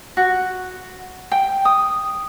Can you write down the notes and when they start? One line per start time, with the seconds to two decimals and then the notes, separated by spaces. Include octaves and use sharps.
0.17 F#4
1.32 G5
1.65 D#6